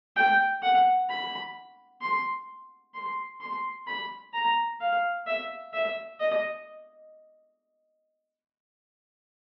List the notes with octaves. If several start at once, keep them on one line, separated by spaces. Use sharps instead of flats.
G5
F#5
B5
C6
C6
C6
B5
A#5
F5
E5
E5
D#5